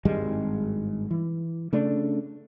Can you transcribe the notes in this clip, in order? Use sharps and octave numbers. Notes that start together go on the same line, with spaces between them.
G#1 G2 G3 G#3
E3
C#3 A3 D4